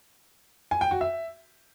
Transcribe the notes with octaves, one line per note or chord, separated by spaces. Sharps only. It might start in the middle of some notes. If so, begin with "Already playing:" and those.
G#5
G5
F#4
E5